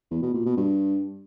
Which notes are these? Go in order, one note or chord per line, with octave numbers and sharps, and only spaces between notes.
E2
B2
A#2
B2
G2